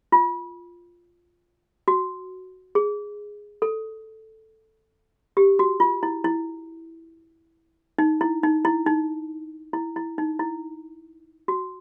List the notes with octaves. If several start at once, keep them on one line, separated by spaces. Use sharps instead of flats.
F4
F#4
G#4
A4
G4
F#4
F4
E4
E4
D#4
E4
D#4
E4
D#4
E4
E4
D#4
E4
F#4